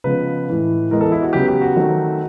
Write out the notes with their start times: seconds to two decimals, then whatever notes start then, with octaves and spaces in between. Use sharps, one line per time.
0.04 C#3 F3 G#3 B3 B4
0.48 A2 E3 G#3
0.91 E3 G#3 B3 A#4
1.01 A4
1.12 E4
1.22 F#4
1.33 C#3 F#3 B3 G4
1.48 G4
1.62 F#4
1.76 D#3 F#3 A3 C4